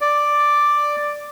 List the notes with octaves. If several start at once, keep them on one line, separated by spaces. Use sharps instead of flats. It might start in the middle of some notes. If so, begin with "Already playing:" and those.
D5